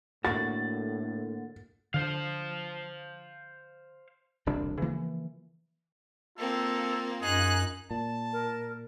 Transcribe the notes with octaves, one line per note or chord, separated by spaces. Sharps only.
A2 D3 A#3 F#4 A6
D3 C5 F5
E1 C2 D3 D4
C#3 E3 F3 A#3
A#3 C4 F4 A4
F#2 D#4 G#4 F#6
A#2 A5
A#4